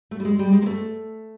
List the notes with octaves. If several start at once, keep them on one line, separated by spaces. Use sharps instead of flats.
A3
G3
G#3
G3
G#3
A#3
A3